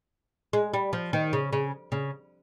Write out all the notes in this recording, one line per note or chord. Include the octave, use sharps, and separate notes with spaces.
G#3
G3
F3
D#3
C#3
C#3
C#3